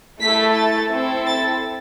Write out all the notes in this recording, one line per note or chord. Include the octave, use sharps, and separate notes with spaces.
A3 E4 A4 B6
A6
C4 E4 A4
A6